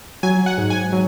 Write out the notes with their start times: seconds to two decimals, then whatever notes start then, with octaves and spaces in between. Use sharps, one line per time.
0.23 F#3 G#5
0.46 F#5
0.58 G#2
0.70 G#5
0.92 F#3